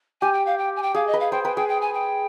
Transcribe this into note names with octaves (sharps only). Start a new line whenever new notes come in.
G4 G#5
G5
F5
G5
G#5
G5
G#4 F5
D#5
B4
F5
C5 G5
B4 G5
G#4 G5
G5
G#5
G5